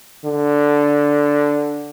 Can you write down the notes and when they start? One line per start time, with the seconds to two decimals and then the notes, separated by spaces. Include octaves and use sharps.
0.24 D3